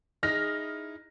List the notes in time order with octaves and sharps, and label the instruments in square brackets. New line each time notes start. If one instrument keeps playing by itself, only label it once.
[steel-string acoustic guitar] D#4 E4 G#4 [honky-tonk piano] F6 A#6